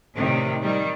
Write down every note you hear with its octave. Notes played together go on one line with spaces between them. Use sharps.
A2 C3 D#3 G3
D#3 G3